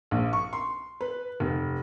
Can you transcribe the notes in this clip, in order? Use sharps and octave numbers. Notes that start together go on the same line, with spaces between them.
A#1
C#6
C6
B4
F1